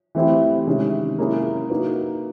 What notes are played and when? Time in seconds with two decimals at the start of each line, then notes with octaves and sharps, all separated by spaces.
0.15 E3 A3 C4 E4 G4
0.67 C3 D#3 G#3 C#4
1.18 A#3 C#4 E4 G#4
1.70 A#3 D#4 F#4 B4